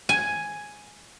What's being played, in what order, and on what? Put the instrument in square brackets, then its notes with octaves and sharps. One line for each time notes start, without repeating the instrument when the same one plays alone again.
[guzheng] G#5